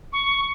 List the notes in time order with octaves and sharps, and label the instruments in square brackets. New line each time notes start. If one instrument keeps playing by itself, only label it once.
[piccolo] C#6